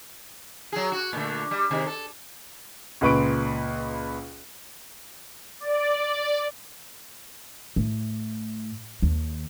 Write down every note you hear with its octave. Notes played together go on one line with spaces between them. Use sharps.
F#3 G#4
F#4
A#2 D3 A3
G3
C3 D#3 G#3
A4
C#2 A#2 B4 C#6 D7
D5
A2
D#2